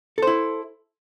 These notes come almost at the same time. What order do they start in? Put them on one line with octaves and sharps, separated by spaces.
A4 C5 E4